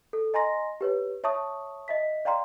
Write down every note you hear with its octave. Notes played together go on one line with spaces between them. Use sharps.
A4
D#5 G#5 A#5 C6 A#6
G4 B4 C#5
C#5 E5 A5 C#6 D#6
D#5 E5 B6
D5 F5 G5 A#5 C6